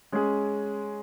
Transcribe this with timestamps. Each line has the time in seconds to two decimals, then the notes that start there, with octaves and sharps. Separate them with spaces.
0.12 G#3 C#4 G#4